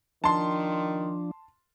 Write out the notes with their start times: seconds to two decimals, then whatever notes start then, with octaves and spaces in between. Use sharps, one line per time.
0.24 D#3 F3 D4 A5 C6